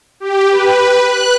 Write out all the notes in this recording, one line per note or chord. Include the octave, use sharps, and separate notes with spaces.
G4
B4
F#6